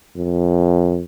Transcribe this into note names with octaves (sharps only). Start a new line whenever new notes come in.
F2